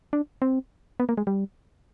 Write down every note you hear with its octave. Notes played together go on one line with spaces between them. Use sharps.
D4
C4
B3
A#3
G#3
G3